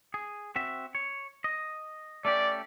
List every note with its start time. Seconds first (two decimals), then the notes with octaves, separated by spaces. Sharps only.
0.14 G#4
0.56 C4 F#4 E5
0.95 C#5
1.44 D#5
2.25 A3 C#4 G4 D5